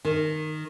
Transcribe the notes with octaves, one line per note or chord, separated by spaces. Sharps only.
D#3